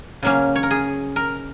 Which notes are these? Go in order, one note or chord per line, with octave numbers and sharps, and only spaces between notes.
C#3 F#3 A#3 C#4
C#5
A#4
G#4
A#4